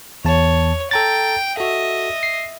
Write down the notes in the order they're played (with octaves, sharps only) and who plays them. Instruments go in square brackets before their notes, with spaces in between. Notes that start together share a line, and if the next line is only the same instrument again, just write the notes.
[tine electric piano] E2 A5 [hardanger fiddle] C#5
[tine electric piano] A4 A#5 A6 [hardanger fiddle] G5
[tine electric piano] F#4 A4 [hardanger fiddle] D#5 E5
[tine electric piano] C7